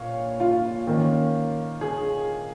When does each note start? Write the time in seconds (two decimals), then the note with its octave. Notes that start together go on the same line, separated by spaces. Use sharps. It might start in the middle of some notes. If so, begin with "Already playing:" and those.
Already playing: A#2 C#5 F5
0.40 F4
0.87 D#3 A#3 C#4
1.81 G#4